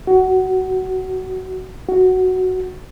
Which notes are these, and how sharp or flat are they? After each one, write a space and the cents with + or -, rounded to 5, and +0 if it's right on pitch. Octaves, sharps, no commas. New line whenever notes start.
F#4 +15
F#4 +0